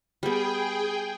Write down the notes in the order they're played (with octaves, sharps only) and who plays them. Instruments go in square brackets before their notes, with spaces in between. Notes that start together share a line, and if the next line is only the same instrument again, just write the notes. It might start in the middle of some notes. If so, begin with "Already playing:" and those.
[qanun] G3 B3 [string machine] G#4 G5